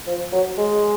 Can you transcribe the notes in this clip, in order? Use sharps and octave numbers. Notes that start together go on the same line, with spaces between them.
F3
F#3
G#3